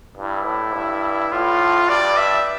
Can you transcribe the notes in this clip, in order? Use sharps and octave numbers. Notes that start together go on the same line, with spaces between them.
G2 E4
A2
G2
A2 F4
G2 D5
E5